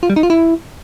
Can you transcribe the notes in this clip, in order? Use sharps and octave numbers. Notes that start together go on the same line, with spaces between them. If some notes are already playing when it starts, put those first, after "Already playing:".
F4
G3
D#4
F4
E4